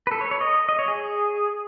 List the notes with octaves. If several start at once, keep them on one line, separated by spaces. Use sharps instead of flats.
B4
A4
C#5
C#5
D#5
D#5
C#5
G#4